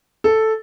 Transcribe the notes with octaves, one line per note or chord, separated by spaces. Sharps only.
A4